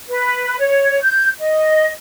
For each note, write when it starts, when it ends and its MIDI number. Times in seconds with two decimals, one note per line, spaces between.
0.09 0.56 71
0.59 0.99 73
1.01 1.28 91
1.38 1.90 75